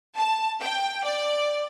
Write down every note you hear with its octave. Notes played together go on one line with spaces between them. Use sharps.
A5
G5
D5